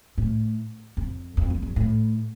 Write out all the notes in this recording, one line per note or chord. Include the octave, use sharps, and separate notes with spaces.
A2
F2
F2
F2
G2
A2